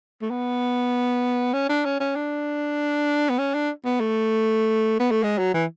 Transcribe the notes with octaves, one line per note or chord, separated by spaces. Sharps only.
A3
B3
C#4
D4
C#4
C#4
D4
B3
C#4
D4
B3
A3
B3
A3
G#3
F#3
E3